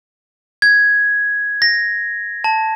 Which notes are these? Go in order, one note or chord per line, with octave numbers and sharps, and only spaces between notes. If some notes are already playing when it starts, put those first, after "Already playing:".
G#6
A#6
A5